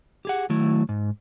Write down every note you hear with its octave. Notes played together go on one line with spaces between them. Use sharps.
G4 G#4 F#5
D#3 F#3 A3 E4
G#2